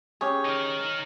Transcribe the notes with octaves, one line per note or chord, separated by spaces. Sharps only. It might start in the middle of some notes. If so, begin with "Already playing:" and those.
C#4 G4 G#4 C#5
D#4 A#4